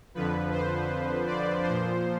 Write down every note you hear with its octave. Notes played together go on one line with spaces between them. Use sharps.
F2 D3 F3 B4
C5
D5
A#2 F3 C5